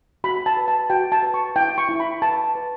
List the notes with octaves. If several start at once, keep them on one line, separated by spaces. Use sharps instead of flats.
F#4 B5
A5
B4
A5
F#4 G5
A5
B4
C#6
E4 G5
C#6
E4
B5
B4 A5
A5
B4